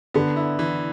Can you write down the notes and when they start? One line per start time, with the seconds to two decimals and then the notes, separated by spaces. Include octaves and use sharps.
0.14 D3 B3
0.36 E4
0.59 E3